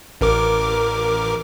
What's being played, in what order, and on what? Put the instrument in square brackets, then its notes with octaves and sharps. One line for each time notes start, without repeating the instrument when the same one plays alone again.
[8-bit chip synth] A1 A#4 D6